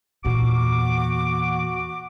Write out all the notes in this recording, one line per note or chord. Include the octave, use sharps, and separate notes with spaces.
E2 A#2 F#4 D6